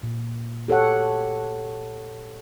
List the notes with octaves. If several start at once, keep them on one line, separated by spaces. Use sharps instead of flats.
A#2
G4 A4 C#5 F#5